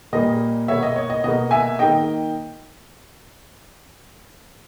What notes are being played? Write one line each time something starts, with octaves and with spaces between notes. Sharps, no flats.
A#2 G3 A#3 D#5
B2 A#3 C#5 E5
D#5
C#5
D#5
B2 A#3 D#5
E5 G#5
D#3 A#3 D#5 G5